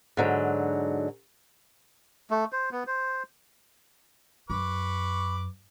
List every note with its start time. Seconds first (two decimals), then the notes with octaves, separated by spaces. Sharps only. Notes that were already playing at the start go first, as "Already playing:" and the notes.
0.17 G#2 D3 F#3
2.31 A3
2.52 C5
2.72 B3
2.87 C5
4.50 F#2 B4 C#6 D6